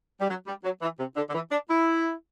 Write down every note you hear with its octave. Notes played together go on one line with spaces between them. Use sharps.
G3
F#3
G3
F#3
E3
C3
D3
D3
E3
D4
E4